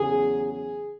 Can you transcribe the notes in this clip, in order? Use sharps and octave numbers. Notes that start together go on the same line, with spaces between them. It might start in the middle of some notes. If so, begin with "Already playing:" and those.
Already playing: E2 C#3 F#3 G#4
G#4